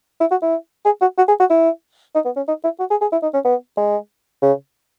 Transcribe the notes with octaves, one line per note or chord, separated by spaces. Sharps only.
E4
F#4
E4
G#4
F#4
F#4
G#4
F#4
E4
D#4
B3
C#4
D#4
E4
F#4
G#4
G#4
E4
D#4
C#4
B3
G#3
C#3